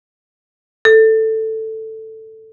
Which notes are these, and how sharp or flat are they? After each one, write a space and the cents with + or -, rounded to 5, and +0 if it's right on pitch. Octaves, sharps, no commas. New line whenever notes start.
A4 +5